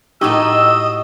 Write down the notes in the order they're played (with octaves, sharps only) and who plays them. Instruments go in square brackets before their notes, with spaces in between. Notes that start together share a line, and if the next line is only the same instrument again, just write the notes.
[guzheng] A2 F#4 [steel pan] D#4 G4 [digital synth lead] D#5 [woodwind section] E6